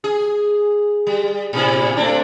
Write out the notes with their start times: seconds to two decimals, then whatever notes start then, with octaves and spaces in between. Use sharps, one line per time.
0.04 G#4
1.07 G3
1.53 A2 C3 E4
1.97 A3 C4 D4